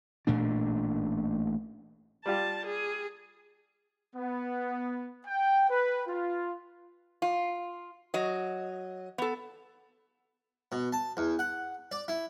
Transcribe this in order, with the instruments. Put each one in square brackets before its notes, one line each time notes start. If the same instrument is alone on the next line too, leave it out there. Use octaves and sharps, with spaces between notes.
[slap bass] A1 A#2 A3 D4
[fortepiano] G3 F4 G4 [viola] A5
[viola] G#4
[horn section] B3
G5
B4
F4
[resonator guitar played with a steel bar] F4
F#3 D#5
B3 A4
[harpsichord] B2
A5
E2
F#5
D5
E4